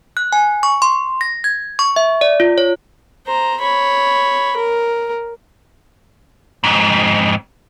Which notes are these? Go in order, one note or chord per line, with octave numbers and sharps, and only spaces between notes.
F#6
G#5
C#6
C6
A#6
G#6
C#6
E5
D5
F4
C#5
C5 A#5
C#5 B5
A#4
F2 G#2